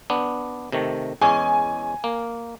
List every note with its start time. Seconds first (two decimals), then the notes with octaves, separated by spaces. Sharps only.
0.10 B3 D4
0.72 C3 D#3 A3
1.21 E2 G#3 C#4 G#5
2.04 A#3